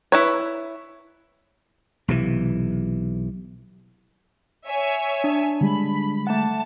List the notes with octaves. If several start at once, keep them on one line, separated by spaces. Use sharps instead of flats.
E4 B4 C#5
B1 C3 E3
C#5 E5 G#5
D4
D3 G3 G#3 B5
A3 F#5 A5